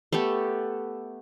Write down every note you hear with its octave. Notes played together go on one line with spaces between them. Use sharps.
A3 B3 G4 A4